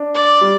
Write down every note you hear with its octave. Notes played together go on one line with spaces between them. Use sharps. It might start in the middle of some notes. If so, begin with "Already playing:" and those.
Already playing: D4
D5
G3